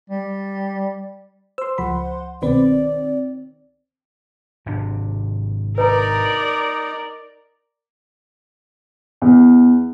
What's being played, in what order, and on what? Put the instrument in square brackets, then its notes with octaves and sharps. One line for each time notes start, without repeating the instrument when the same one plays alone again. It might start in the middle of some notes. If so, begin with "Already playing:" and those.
[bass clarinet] G3
[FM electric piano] C5 C6 [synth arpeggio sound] E6
[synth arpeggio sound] C#2 F3 B5 [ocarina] F#5
[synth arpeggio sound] C2 B2 B4 [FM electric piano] D#3 C4 [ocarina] D5
[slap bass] G#1 C3 D4
[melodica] D#4 [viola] A#4 D5 [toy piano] B4 A#5
[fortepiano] E2